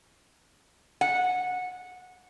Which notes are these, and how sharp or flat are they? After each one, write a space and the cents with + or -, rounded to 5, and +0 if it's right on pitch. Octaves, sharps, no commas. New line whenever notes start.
F#5 -20